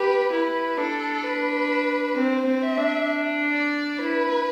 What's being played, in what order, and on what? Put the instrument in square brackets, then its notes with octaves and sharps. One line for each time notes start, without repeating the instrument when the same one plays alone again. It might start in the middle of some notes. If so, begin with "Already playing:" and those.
Already playing: [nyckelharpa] G4 [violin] B4
[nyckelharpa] E4 [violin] B4
[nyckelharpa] D4 [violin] A4
[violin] B4
[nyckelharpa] C4 [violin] C5
[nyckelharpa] C4
[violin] E5
[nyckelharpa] D4
[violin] D5
[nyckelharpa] E4 [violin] B4